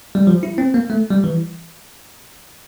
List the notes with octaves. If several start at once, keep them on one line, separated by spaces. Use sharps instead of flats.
G3
F3
E4
C4
A#3
A3
G3
E3